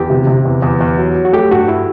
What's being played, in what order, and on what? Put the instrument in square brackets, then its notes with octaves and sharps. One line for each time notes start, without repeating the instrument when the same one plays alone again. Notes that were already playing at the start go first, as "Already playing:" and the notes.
Already playing: [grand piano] E2 [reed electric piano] G4
[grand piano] C3
C3
E2
E2
E2
F#3
F#3
[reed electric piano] F#4
[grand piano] A3 [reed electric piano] G4
[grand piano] G2 [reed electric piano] F#4
[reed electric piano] E4